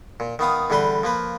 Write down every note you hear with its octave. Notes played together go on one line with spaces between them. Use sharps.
A#2
D#3 B3 F5 D#6
E2 D3 G3 B4 C6
F3 A#3 B4